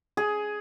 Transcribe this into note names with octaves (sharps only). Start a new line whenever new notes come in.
G#4